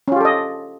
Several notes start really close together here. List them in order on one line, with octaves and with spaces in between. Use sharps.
C#4 F4 G4 A4 D#5